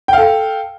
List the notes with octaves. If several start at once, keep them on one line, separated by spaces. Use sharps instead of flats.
A4 F5 G5